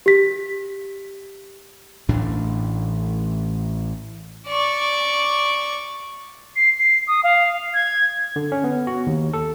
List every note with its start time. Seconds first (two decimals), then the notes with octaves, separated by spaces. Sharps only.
0.06 G4 B6
2.09 A1 A2 E3 D4
4.47 D5 C#6
6.56 C7
6.78 C7
7.07 D#6
7.24 F5
7.74 G#6
8.36 D3
8.52 C#4
8.64 B3
8.87 F#4
9.07 D#2
9.33 A4